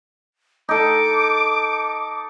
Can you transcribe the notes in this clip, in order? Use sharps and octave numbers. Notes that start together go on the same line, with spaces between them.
D#4 A4 D6